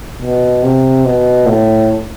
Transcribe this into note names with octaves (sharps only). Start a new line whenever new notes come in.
B2
C3
B2
A2